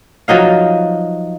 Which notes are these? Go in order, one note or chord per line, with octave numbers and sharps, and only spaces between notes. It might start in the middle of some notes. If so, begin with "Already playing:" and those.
F3 F#3 D#4 F5